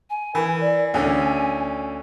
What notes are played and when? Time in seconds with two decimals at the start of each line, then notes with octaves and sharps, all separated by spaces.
0.10 G#5
0.35 E3 A#4
0.60 D5
0.94 D2 D3 C#4 G#5